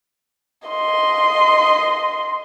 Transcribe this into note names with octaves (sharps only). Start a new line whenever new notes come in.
D#5 C6